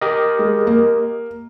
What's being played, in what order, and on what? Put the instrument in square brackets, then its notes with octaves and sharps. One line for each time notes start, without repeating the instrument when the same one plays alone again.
[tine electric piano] G4 A#4 D#5
[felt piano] G#3
A#3